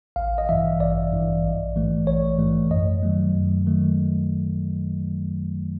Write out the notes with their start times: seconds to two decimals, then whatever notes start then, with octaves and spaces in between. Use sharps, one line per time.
0.16 A1 F5
0.38 D#5
0.49 G2 E3 E5
0.80 A1 D5
1.12 G2 E3
1.44 A#1
1.76 G#2 E3 A3
2.07 A#1 C#5
2.39 G#2 E3 A3
2.70 F#2 D#5
3.02 D#3 F#3 A3
3.35 F#2
3.66 D#3 F#3 A3